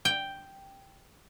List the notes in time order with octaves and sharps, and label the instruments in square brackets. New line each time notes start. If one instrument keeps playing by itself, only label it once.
[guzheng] G5